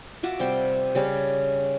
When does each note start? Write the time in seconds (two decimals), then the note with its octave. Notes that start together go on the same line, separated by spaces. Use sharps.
0.23 F4 F#4 E5 D6
0.40 C3 G3 C5 G5
0.95 C#3 G3 C#4